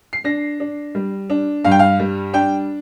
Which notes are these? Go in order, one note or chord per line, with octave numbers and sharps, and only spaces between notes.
C7
D4 A#6
D4
G3
D4
G2 F5
G5
F5
G3
D4 G5